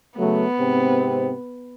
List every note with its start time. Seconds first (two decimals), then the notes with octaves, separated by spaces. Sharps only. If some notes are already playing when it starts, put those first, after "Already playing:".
0.19 C#3 F#3 A3 B3
0.59 G#2 C3 C4